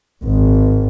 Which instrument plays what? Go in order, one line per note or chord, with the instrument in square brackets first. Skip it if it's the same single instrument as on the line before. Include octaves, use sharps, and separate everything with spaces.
[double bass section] G#1